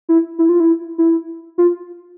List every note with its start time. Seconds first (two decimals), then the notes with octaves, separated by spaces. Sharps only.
0.09 E4
0.39 E4
0.49 F4
0.60 E4
0.98 E4
1.58 F4